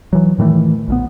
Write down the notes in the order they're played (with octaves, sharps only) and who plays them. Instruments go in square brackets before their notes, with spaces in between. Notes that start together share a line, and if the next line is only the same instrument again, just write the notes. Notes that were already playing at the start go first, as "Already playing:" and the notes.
[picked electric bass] E3 F#3
A2 D#3 E3 A3
A#1 D#3 B3